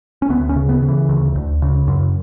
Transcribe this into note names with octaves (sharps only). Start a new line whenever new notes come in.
C#4
D2 B3
C#4
C#3
B3
C#3
E3
D2
D2
C#3
F#2